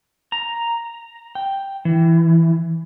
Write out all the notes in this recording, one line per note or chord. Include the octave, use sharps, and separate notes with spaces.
A#5
G5
E3